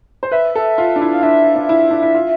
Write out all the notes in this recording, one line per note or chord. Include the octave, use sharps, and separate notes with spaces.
C5
B4 E5
A4
F4
D4
E4
F5
D4 E5
D4
E4
D4
E4
F4